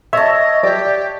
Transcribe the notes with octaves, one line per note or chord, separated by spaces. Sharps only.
C#5 D#5 E5 A5
G4 D5